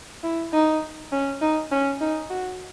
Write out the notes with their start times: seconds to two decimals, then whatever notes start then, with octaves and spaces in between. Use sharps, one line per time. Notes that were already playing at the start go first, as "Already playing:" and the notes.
0.23 E4
0.53 D#4
1.12 C#4
1.41 D#4
1.71 C#4
2.01 D#4
2.30 F#4